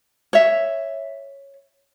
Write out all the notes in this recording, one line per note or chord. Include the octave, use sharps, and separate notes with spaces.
C#5 E5